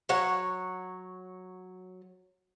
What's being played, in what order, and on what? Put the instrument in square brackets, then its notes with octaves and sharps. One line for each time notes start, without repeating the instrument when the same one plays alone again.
[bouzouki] F#3 C#5 F#5